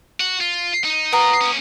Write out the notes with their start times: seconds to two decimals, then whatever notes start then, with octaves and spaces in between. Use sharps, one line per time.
0.20 F#4
0.41 F4
0.84 D#4
1.13 B3 F4 A#4 C#5 A#5
1.41 A#3 C#4